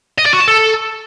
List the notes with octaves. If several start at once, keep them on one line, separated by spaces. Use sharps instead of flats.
D#5
D5
F#4
A5
A4